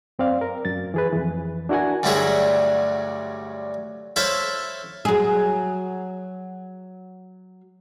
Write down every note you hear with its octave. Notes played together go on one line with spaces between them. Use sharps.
F#2 C4 D5 F5
A#4
F#2 A6
E3 G#4 B4
F2 E3
D4 E4 F#4 A#4 F#5 G#5
D2 G2 D3 F#3 E4 G#4
E4 A4 C5 C#5 E5 F5
F#3 G#4